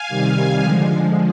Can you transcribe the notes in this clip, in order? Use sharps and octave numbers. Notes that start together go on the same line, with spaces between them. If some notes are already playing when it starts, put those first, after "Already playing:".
Already playing: F5 G#5
C3 D#3 G3
D3 F3 G#3